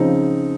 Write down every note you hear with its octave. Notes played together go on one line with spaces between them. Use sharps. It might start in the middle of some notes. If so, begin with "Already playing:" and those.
Already playing: C#3 F3 C4 D#4